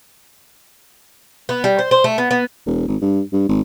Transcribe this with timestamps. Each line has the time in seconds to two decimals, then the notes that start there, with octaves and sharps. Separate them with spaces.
1.49 B3
1.64 G3
1.79 C5
1.91 C5
2.04 A3
2.18 B3
2.31 B3
2.66 E1
2.88 G#1
3.02 G2
3.33 G2
3.49 G#1